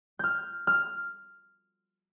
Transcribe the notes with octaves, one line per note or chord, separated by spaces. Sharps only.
F6 G6
F6